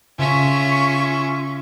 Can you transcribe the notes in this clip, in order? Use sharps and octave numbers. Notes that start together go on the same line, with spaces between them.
C#3 C#4 F4 E5 C#6